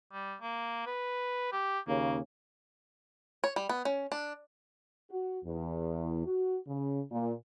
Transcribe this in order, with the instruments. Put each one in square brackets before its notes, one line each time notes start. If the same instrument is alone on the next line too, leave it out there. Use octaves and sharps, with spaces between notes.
[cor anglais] G3
A#3
B4
G4
[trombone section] D#2 C#3 [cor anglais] A#3
[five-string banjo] C#5
G3
B3
C#4
D4
[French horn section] F#4
E2
F#4
C#3
A#2